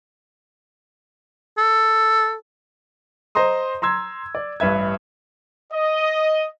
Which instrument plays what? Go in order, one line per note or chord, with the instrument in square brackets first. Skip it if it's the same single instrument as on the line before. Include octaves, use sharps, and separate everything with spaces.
[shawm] A4
[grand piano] C5 D#5 A#5 C6 D#6
A#5 C6 E6 G#6
D5
A1 G2 B4 E5 G#6
[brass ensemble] D#5